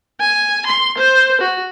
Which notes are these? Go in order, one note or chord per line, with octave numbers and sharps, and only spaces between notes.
G#5
C6
C5
F#4